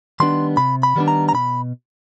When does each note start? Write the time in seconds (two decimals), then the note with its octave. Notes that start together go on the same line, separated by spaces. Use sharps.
0.20 D#3 G3 B3 D4 C6
0.57 C3 B5
0.83 B5
0.96 D#3 G3 B3 D4
1.08 A#5
1.29 A#5
1.34 B2 B5